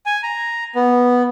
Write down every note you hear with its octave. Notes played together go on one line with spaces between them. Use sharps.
G#5
A#5
B3